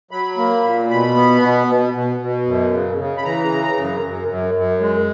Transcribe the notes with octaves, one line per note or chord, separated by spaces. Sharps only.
F#3 B5
A#3
A#2
B2 B5
B3
B2
B2
B2
B2
F#2
C#3
C#3
B5
E3 A#5
C#3
F#2
F#2
F#2
F#2
G#3